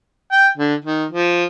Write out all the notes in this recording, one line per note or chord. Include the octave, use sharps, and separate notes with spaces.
G5
D3
D#3
F3